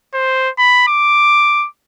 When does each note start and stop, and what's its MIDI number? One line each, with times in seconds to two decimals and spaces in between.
0.14 0.49 72
0.58 0.84 83
0.87 1.67 86